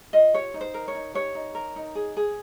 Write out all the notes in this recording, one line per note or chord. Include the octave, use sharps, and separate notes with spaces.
F4 D#5
G4 C#5
D#4
C5
A#4
C#5
D#4
G4 C#5
D#4
A#4
D#4
G#4
G#4